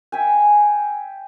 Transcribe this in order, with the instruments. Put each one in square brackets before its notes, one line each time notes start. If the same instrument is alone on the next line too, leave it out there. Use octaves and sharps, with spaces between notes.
[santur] E5 G5 G#5